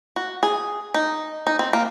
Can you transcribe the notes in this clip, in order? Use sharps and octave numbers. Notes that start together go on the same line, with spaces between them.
F#4
G#4
D#4
D#4
C4
A#3